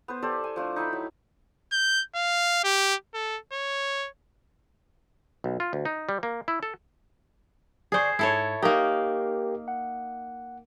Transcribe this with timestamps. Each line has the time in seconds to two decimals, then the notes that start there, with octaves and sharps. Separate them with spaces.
0.08 B3 B4 C5
0.22 G4 A4 C5 D5
0.44 G#5
0.56 F3 A3 D4
0.76 D#4 E4 G5 B5
0.93 F#3
1.72 G6
2.15 F5
2.64 G4
3.14 A4
3.53 C#5
5.44 B1
5.60 F4
5.73 D2
5.85 D#4
6.09 G3
6.23 A#3
6.48 E4
6.63 A4
7.92 G1 G#4 C5 D5 C#6
8.19 G#2 E4 A4 C#5
8.62 A#3 D#4 G4 A#4 F5
9.68 F#5